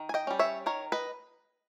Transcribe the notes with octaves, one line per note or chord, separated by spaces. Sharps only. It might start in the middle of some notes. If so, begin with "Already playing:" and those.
Already playing: D#3
G#5
D#5 G5
G3 C#4
C#5 E5
D#3 A#4 C#5
B4 D#5